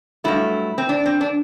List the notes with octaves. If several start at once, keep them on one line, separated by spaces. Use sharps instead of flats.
G2 F#3 A3 E4
C4
D4
C4
D4